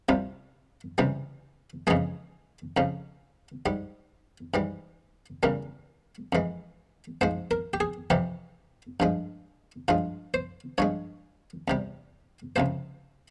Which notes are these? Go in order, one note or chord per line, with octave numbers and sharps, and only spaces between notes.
C2 C3 G3 F4
C#2 C3 E3 G3
F2 C#3 E3 G#3 G#4
F2 C#3 F3
G#2 G3
G#2 E3 G3
E2 C#3 E3 G3 A#4
F2 E3 G#3
G#2 F3 G#3 C5
A#4
G4
G#4
F2 C3 E3 G4
G2 F3 G#3
G2 F3 G#3 F4
C5
G2 F3 G#3 C#5
E2 C3 G3
C#2 C3 F3 C5